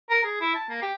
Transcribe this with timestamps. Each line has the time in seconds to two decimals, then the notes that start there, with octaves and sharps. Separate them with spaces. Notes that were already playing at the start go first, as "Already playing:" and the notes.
0.10 A#4
0.24 G#4
0.41 E4
0.55 A5
0.69 A#3
0.82 G4